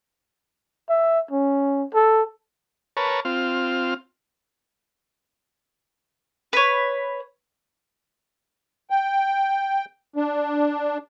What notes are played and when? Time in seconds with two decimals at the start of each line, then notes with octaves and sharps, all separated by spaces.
0.89 E5
1.31 C#4
1.94 A4
2.97 A#4 B4 C#5 A5
3.25 C4 F4 F6
6.53 B4 C#5
8.90 G5
10.16 D4